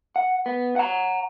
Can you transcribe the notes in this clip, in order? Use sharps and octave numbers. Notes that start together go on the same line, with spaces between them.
F#5
B3
F#5 A#5